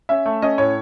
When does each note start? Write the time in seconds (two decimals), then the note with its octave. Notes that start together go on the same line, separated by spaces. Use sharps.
0.09 C#4 E5
0.26 A3
0.42 C#4 D#5
0.58 A2 C#5